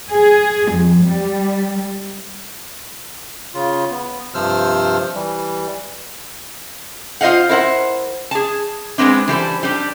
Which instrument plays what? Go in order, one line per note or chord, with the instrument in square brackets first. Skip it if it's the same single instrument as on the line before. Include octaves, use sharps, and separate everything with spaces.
[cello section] G#4
F2
G3
[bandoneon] C#3 F4
B3
G2 C3 F3 C5 E6 F6
E3 G3
[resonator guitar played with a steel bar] F4 C5 D#5 F5 F#5
E4 A#4 C5 F#5
G#4 A5
G#3 B3 C4 D4
E3 G3 A4 C5
G3 D4 G4